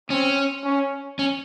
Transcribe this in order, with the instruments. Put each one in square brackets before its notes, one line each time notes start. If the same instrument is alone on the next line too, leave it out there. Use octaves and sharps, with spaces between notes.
[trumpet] C4 [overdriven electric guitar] C#4
[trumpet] C#4
[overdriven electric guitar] C#4